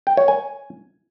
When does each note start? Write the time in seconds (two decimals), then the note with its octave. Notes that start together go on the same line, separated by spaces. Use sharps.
0.07 G5
0.17 C#5
0.28 G#5